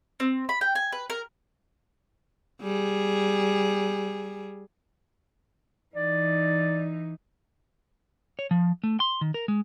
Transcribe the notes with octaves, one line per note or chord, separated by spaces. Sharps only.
C4
B5
G5
G#5
B4
A#4
G3 G#4
E3 D#4 D5
C#5
F3
A3
C6
D#3
A#4
G#3